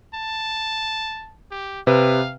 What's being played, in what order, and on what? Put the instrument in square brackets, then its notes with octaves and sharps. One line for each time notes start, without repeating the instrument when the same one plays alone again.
[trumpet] A5
G4
[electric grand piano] C3 B4 [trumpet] F5